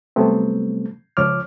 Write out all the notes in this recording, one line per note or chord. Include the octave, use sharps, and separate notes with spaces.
C3 F#3 G3 A3 B3 C4
C#2 F3 C#5 D6 F6